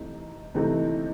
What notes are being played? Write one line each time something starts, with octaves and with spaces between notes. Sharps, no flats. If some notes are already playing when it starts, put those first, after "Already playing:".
Already playing: C3 E3 A3 C4 D#4
C3 E3 A3 C4 D#4